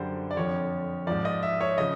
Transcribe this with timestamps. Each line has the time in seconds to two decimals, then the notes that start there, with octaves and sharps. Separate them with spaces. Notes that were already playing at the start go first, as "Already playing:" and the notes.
Already playing: F#2 D3 G3 C5
0.31 D5
0.37 F2 D3 F3 C#5
1.07 G#2 F3 D5
1.25 D#5
1.43 E5
1.61 C#5
1.78 C#3 F3 D#5